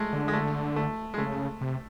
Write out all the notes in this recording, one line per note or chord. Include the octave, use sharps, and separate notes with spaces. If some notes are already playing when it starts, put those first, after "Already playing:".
Already playing: G#3 A3
D3
G#3
A3
A3
G#3
C#3 A3
C3